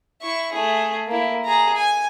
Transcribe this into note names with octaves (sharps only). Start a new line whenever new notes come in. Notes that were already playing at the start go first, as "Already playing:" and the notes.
E4 C#6
A3 G#4
A#3 E4
G#4 A#5
G#5